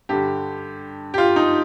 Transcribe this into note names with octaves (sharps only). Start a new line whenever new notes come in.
G2 D3 G4
G4
F4
D#4